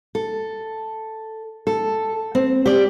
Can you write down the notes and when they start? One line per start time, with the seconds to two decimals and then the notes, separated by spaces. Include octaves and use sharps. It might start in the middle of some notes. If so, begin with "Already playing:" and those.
0.15 A4
1.67 A4
2.35 C4
2.66 G4 D5